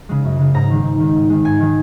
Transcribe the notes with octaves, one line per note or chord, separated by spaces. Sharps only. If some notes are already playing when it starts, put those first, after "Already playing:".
C#3 G#3
F#2
C#3 G#3
G#2 A#5
D#3 G#3
G#2
D#3 G#3
G#2
D#3 G#3
G#2 G#5
D#3 G#3